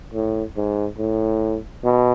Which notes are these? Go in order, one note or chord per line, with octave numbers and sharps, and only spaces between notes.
A2
G#2
A2
B2